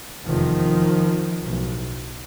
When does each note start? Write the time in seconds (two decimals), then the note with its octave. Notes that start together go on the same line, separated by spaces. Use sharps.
0.25 F1 E2 C3 D#3 F3
1.41 B1 A2